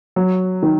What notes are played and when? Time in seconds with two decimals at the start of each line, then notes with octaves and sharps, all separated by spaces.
0.16 F#3
0.63 D#3